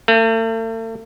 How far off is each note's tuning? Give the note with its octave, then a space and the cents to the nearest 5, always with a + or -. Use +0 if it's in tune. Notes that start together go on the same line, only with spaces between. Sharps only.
A3 +40